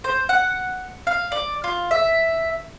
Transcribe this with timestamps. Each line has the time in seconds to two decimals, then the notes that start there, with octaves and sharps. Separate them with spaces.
0.04 C5
0.29 F#5
1.07 F5
1.32 D5
1.64 F4
1.91 E5